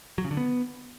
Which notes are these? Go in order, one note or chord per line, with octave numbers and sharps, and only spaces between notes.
F#3
C#3
D3
B3